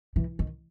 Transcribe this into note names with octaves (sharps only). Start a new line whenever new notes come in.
E3
D#3